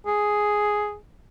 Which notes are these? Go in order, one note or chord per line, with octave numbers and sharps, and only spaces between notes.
G#4